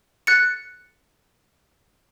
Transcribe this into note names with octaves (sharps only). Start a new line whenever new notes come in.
F#6 A6 C#7